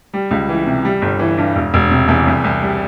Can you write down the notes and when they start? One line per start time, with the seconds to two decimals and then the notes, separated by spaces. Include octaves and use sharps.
0.14 G3
0.31 C#2
0.49 E3
0.67 C3
0.85 G3
1.02 G1
1.19 E3
1.38 G2
1.56 E1
1.74 E1
1.91 C3
2.08 E2
2.27 C2
2.44 C2
2.62 G3